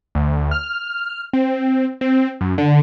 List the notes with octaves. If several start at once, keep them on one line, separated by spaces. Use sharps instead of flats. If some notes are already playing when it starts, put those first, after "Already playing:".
D2
F6
C4
C4
F#2
D3